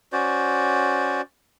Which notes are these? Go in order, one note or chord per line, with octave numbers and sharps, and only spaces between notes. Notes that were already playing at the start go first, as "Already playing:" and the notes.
C#4 F#4 C5 D5